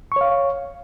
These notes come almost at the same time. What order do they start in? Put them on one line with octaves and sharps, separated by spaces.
C#6 C#5 F5